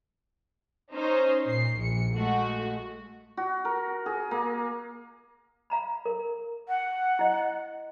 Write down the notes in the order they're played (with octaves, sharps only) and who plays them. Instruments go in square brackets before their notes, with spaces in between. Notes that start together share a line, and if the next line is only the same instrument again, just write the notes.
[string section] C#4 D#4 C5
A#2 C7
A#1 C#7
G#3 A3 F#4
[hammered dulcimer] F#4
A#4
G#4
A#3
[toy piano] F5 A#5 B5
A#4
[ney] F#5
[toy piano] E4 D#5